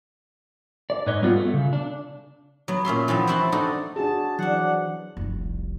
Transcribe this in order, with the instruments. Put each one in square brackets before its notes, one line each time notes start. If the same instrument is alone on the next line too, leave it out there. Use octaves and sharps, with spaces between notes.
[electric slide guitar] D5
G#2 B4 C#5 D#5
G3 B3 C4 F4 F#4
A3
C#3
D4
[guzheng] F#3 B3
A#2 C#4 E5 C6
E3 F3 B3 C4
C4 E4 F#4 F#5 A5 C6
D4 D#4 F#4 A4 D#5
[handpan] D4 F#4 G#4 [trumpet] A5
[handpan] E3 F#3 [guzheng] D4 C5 [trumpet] F#5
[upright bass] F1 C2